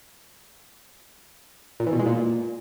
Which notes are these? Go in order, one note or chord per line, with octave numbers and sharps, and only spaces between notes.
A#2
E3
B2
G#3
A#2